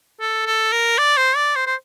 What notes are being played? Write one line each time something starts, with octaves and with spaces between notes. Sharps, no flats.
A4
A4
A#4
D5
C5
D5
C5
C5